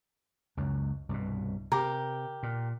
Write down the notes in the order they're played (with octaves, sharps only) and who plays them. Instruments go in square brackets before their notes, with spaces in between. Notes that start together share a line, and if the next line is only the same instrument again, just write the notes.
[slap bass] C#2 F#2
C2 G2 B2
[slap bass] C3 [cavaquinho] G4 A#4
[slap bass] A#2